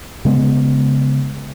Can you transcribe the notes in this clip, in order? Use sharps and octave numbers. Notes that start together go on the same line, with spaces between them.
C#3 G#3 B3